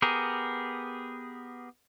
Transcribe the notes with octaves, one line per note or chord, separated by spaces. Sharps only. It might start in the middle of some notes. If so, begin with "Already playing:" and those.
B3 G4 G#4 A#4